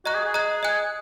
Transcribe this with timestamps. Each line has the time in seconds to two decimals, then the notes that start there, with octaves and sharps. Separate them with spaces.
0.05 F#4 D#5 A#5 F#6
0.15 G#4
0.25 G#4
0.34 D#5 A#5 F#6
0.63 D#5 G#5 F#6